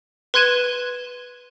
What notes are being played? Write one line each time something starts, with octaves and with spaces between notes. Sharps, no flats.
B4 C6 F#6 G#6 D#7 E7